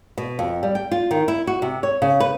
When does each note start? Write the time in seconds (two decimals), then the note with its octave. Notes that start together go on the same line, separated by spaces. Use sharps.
0.18 B2
0.39 F2
0.63 G3
0.75 G5
0.91 F4
1.11 D#3
1.28 E4
1.47 F#4
1.62 C3
1.83 C#5
2.02 C#3
2.20 B4